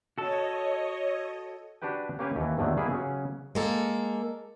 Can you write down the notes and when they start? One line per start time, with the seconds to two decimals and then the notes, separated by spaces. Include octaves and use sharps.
0.18 F#4 A4 C#5 D#5
1.82 D4 F#4 G4 B4 G5
2.19 A#3 C#4 G4 B4 F5 G#5
2.36 D#2 E3
2.58 E2 A2 D3 D#3 F#3
2.77 G3 A#3 B3 E4 G4 G#4
2.90 C#3 F#3 C#4
3.55 G#3 A#3 A4